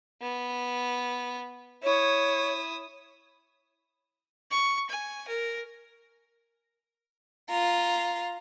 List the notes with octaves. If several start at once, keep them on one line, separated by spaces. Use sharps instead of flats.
B3
E4 C#5 D#6
C#6
G#5
A#4
F4 A#5